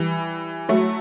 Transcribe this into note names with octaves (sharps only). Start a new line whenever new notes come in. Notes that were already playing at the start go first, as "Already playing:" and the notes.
Already playing: E3 G3
F#3 A3